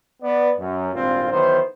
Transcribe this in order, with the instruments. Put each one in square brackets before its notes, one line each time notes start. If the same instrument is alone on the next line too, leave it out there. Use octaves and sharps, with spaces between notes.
[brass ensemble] B3 D5
F#2
G#1 G2 A#2 C4 F4
D#3 E3 F#3 B3 C5